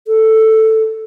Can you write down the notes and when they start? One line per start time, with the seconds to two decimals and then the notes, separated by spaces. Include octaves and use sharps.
0.07 A4